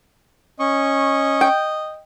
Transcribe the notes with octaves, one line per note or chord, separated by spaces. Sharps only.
C#4 D#5 C#6
G5